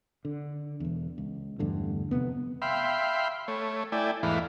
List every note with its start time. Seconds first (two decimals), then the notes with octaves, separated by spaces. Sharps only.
0.25 D3
0.80 E1 E2
1.18 C#2
1.59 E2 G2 D3 A3
2.11 F1 A2 C3 B3
2.62 E5 F5 G5 B5 C6
3.48 A3 C#5
3.92 A3 E4 D5 G5 G#5
4.23 E2 G#2 E3 A3 F5 B5